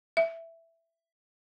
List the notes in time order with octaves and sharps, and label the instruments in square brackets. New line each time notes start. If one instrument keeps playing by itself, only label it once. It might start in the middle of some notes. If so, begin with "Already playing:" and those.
[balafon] E5